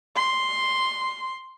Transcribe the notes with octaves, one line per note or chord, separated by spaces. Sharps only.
C6